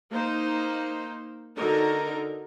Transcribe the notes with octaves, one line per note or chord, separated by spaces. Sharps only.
A#3 D#4 C5
D3 D#4 F#4 A#4